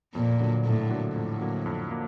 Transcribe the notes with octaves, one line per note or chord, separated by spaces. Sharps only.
F2 A#2
D3 F#3 A#3
F2 A2
D3 F#3 A#3
F2 A2
D3 F#3 A#3
F2
A#3